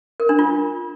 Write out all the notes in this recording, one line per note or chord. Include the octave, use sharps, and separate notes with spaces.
A#4
D4
F4